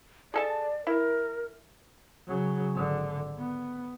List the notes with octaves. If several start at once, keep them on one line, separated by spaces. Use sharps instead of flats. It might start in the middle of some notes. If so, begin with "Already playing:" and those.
G#4 A4 D5 A5
E4 A#4
C#3 F#3
G#1 D3
B3